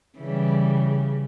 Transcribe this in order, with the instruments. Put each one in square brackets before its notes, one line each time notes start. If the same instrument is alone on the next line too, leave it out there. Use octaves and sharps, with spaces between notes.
[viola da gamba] C#3 [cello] E3 G3